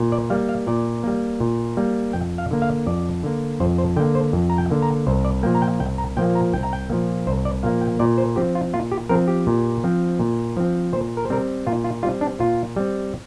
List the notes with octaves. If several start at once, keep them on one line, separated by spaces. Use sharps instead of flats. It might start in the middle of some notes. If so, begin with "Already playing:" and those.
Already playing: A#2
D5
G3 A#3 F5
F5
A#2 D5
G3 A#3
A#2
G3 A#3
F2 G5
F5
D3 A#3
F5
F2 D5
D3 A#3
F2 C5
C5
D3 A#3 G5
C5
F2
A#5
G5
D3 A#3
A#5
C2 C5
D5
A#2 F3 A#3 G5
A#5
G5
C2 G5
A#5
A#2 F3 A#3 G5
A#5
C2 G5
A#5
G5
A#2 F3 A#3
C2 C5
D5
A#2 F3 A#3 F5
G5
A#2 D5
C5
F3 C4 G4
F4
A#2 F4
G4
F3 C4 A#4
G4
A#2
F3 C4
A#2
F3 C4
A#2 C5
A#4
C5
G3 C4 A#4
A#2 F4
F4
G3 C4 F4
D4
A#2 F4
G3 C4